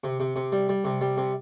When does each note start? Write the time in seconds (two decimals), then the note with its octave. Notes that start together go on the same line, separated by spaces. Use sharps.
0.04 C3
0.20 C3
0.36 C3
0.52 G3
0.69 G3
0.84 C3
1.01 G3
1.17 C3